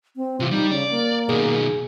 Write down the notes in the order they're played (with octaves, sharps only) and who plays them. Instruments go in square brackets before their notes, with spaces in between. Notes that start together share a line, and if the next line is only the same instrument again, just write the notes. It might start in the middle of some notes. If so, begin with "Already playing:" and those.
[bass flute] C4
[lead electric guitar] C3 E3 [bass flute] F4
[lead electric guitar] G3 [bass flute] D#4
[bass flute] C#3 [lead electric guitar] D5
[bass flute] A#3
[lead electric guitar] B2 D#3 [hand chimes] G#4